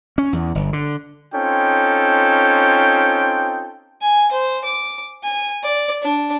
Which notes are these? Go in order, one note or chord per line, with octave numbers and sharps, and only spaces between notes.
C#4
E2
G1
D3
C4 C#4 D#4 F4 A4 G5
G#5
C5
D6
G#5
D5
D4